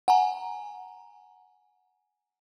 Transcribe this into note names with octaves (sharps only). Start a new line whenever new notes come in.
F#5 G#5 A#5